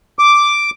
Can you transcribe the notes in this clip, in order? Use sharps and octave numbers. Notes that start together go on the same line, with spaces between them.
D6